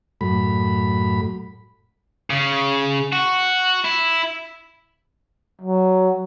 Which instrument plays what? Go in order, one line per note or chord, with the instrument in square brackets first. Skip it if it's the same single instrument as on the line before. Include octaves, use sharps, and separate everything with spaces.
[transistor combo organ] F#2 A2 B5
[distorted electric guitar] C#3
F#4
E4
[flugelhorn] F#3